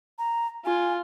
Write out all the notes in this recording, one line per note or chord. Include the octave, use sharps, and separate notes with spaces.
A#5
F4 G#5